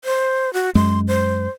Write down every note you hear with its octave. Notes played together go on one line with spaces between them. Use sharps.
C5
F#4
F#2 G#3 C6
C5